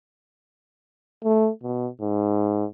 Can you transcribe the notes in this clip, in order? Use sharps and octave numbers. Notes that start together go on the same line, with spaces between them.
A3
B2
G#2